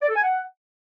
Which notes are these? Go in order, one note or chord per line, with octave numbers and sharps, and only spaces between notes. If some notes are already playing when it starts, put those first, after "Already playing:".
D5
A4
G#5
F#5